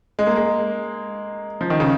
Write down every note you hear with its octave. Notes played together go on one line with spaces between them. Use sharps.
G#3
A#3
G#3
F3
D#3
C#3